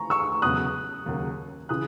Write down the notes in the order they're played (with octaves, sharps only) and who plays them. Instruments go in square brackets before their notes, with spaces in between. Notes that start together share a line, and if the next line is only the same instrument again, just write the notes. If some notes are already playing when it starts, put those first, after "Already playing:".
Already playing: [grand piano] A#5 C#6
C#6 E6
[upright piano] E2 C#3 F#3 B3 [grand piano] D#6 F#6
[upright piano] D#2 C#3 F#3 A#3
[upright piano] C#3 E3 [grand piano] D#6 F#6